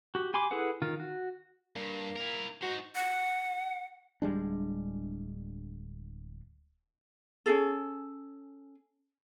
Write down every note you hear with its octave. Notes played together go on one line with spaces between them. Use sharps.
F#4 G4
G4 G#5 B5 C6 D6
E4 G#4 A4 B4 F#5
D#3 F4
F#4
G2 A#3
E4 A#4
D#4 F#4 C5
F#5
D1 G3 G#3 D4
C#4 D#4 G#4 A4